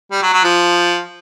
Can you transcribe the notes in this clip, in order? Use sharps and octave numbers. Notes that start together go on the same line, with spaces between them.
G3
F#3
F#3
F3